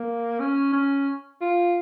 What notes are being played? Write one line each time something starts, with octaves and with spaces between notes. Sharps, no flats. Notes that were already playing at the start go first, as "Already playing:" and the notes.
Already playing: A#3
C#4
C#4
F4